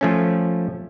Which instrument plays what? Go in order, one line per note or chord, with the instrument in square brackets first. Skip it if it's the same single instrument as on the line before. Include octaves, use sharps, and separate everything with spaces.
[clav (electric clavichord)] F3 A3 C#4